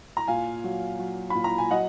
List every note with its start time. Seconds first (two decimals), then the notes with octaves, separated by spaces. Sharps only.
0.17 A#5
0.27 A#2 F5 G#5
0.64 F#3
0.99 F#3
1.30 A#2 B5
1.44 A#5
1.58 G#5
1.71 F#3 D#5 F#5